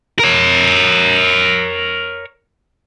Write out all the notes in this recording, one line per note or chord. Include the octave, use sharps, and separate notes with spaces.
A#4 C#5